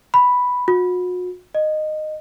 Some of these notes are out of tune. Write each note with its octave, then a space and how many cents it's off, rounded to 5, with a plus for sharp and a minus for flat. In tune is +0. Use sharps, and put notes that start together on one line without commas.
B5 +0
F#4 -40
D#5 -15